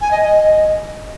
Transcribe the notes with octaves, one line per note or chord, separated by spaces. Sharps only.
G#5
D#5
D#5